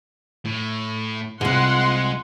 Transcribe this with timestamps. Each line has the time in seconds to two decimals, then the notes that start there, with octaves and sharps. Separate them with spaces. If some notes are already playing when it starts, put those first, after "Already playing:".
0.45 A2
1.41 C2 G#2 G#3 F4 F#5 C6